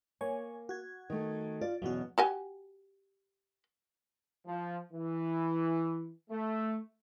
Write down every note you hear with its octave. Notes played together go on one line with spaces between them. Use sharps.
A#3 C#5 G#5
F#4 G#6
D#3 A3
F4 D5
E2 B2 F#3 C#4 F#4
F#4 G4 G#5
F3
E3
A3